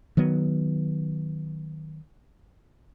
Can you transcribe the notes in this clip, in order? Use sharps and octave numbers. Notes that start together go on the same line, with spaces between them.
D#3 F#3 B3